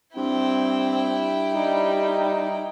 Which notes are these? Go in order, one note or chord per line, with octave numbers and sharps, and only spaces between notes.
G2 C4 E4 G5
G3 D#4